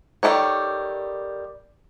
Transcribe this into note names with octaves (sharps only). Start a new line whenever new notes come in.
D#3 G3 E4 A4 C#5